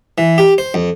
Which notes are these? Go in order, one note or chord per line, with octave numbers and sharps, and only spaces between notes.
E3
G4
C5
F2